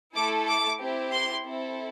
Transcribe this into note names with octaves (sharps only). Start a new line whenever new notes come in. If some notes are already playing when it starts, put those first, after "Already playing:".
A3 E4 A4 D6
D6
C4 E4 G4
C6
C4 E4 A4